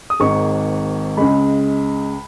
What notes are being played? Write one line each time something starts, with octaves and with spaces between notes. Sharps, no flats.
D#6
G#1 G#2 D#3 C#6
C#2 C#3 G#3 B5